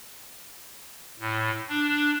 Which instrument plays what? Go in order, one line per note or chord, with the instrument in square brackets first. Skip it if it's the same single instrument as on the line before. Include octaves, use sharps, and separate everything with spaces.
[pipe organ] A2
D4